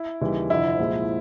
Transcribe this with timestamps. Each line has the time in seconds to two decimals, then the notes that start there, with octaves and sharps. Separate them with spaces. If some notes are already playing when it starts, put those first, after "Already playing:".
Already playing: E4
0.21 D#2 C#3 E3 G3
0.50 F1 F2 D3 F3 E4
0.79 C2 A#2 F3 G#3